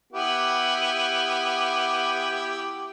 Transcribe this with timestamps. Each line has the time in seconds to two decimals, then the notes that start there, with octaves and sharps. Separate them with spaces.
0.13 B3 E4 G4